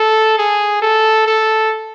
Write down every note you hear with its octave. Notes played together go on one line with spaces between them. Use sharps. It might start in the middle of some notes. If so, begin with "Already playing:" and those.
Already playing: A4
G#4
A4
A4